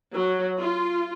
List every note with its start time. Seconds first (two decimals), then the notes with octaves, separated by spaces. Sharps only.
0.14 F#3
0.57 F4